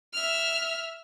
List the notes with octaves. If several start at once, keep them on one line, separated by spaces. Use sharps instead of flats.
E5 F6